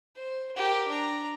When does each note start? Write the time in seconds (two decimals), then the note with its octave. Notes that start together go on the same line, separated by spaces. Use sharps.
0.16 C5
0.56 G4 A#4
0.88 D4 A#5